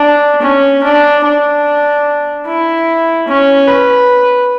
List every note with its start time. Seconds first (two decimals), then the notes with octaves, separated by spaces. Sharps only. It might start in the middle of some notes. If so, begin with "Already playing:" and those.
Already playing: D4
0.42 C#4
0.84 D4
1.24 D4
2.47 E4
3.28 C#4
3.68 B4